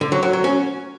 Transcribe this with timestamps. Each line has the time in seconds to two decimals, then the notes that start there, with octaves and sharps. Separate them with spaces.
0.01 D3
0.12 F#3
0.23 F#3
0.33 F#3
0.44 C#4